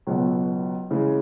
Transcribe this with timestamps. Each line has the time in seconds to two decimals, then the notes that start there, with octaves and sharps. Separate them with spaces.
0.07 C#2 B2 F#3 B3
0.91 C#3 E3 G#3